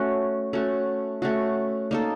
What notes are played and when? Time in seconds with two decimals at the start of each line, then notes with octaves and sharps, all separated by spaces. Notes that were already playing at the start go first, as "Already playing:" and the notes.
Already playing: A3 C#4 F#4
0.53 A3 C#4 F#4
1.22 A3 C#4 F#4
1.91 A#3 D#4 A4